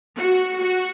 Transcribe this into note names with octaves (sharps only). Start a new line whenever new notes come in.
F#4
F#4